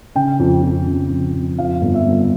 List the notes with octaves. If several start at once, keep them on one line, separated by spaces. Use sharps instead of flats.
C#3 G5
F2
F2
C#3
F2
F2
F2 F5
G1
E5
G1